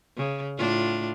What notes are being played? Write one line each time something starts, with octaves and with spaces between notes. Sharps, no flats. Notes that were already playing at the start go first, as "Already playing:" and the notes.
C#3
A2 D4 F4